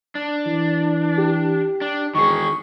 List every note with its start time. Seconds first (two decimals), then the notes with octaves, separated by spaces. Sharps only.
0.15 D4
0.46 E3
1.17 G4
1.81 D4
2.15 E1 D#3 G#4 C#6